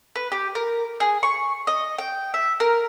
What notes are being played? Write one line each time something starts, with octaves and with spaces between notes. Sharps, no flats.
B4
G4
A#4
G#4
C#6
D#5
G5
E5
A#4